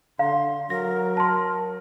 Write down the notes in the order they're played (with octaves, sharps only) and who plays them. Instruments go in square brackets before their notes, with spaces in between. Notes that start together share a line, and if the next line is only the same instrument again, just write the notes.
[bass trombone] D3 [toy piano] F5 [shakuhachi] C6
[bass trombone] F#3 [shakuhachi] A#4 [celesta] A#6
[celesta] A5 C6